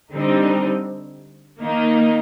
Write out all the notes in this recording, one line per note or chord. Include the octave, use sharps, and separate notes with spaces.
D3 G3 C4 D#4
D#3 A#3 D#4